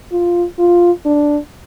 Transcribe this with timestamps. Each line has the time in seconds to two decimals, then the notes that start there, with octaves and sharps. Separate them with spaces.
0.12 F4
0.59 F4
1.05 D4